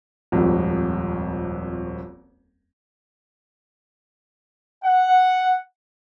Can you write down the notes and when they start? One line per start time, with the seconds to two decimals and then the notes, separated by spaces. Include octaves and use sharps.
0.32 D#1 G#1 F2
4.84 F#5